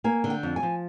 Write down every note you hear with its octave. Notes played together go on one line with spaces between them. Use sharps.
A#3 G#5
D3
G5
F2
G#5
F3